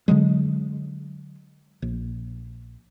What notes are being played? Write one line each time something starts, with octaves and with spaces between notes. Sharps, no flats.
D3 D#3 F#3 G#3
A#1